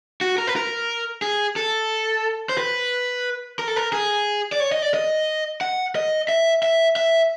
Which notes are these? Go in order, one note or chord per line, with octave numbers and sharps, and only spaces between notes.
F#4
A#4
B4
A#4
G#4
A4
C5
B4
A#4
A4
A#4
G#4
D5
C#5
D#5
D5
D#5
F#5
D#5
E5
E5
E5